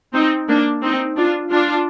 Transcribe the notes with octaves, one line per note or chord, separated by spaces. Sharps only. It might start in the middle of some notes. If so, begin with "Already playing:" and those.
C4 D#4
A#3 D4
C4 D#4
D4 F4
D4 F4